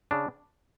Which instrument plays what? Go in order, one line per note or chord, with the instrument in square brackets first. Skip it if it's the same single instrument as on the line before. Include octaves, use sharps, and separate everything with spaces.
[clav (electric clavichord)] C#3 D4